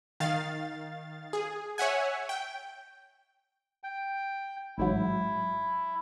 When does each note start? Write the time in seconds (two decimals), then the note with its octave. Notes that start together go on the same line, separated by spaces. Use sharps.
0.20 D#3 F5 A6
1.33 G#4
1.78 C#5 E5 F#5 G#5
2.29 G5
3.84 G5
4.78 A1 G#2 F#3 E4